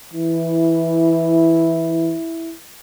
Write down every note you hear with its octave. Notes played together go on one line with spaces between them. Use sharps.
E3 E4